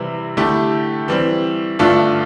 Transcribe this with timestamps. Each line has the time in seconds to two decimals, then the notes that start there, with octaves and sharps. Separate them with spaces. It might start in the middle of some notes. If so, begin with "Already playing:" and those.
Already playing: C3 E3 G3 C4 E4
0.37 D3 A3 E4 G4
1.08 E3 G3 C4
1.79 G2 D3 A3 D4 F4